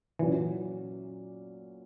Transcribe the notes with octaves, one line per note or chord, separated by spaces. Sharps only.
A#2 E3 F#3 C#4